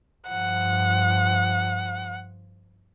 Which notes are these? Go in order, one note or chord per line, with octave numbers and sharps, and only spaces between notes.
G2 F3 F#5